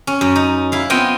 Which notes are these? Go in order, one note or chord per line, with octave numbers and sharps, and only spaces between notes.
C#4
F#2
D#4
E4 F5
B3 C4 F4 D#5 G5